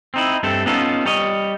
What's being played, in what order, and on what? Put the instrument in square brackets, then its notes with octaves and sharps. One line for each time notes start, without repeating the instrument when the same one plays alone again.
[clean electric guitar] C4 D#4 E4
G2 A3 C4 A4
B3 C#4 D#4 F4 A4
G3 C#5 D#5